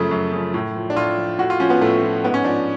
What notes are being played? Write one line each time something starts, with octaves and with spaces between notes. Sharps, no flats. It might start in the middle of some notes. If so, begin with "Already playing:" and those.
Already playing: F#2 C#3 F3 A3
F#2
C#3 F3
A2
F3
D4
A2 F4
F3
A2 F#4
F4
F3 C#4
B3
A2 A3
F3
G#2 B3
C#4
F3 D4